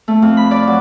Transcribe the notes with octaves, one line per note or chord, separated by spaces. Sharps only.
A3
F2
B5
D5
F#3